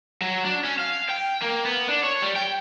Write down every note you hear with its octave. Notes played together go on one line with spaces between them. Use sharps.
F#3
D4
C#4
F5
G5
A#3
B3
D4
C#5
G3
G5